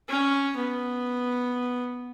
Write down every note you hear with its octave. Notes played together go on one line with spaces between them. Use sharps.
C#4
B3